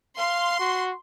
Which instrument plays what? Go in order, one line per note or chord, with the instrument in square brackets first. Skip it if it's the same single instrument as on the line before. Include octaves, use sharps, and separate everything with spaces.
[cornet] F5 [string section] C6
[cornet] F#4